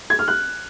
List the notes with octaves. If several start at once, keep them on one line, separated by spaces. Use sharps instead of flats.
G#6
F6
F#6